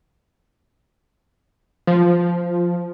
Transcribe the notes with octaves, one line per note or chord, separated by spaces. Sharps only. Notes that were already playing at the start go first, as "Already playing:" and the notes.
F3